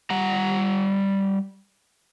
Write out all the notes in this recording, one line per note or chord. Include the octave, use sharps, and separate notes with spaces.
G3 F#5 A#5